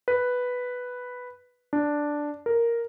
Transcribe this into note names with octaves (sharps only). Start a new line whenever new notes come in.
B4
D4
A#4